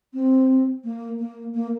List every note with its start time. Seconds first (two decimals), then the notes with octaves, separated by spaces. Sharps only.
0.14 C4
0.84 A#3
1.19 A#3
1.55 A#3